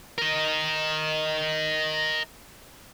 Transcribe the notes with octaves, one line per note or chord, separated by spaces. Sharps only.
A#4 D#5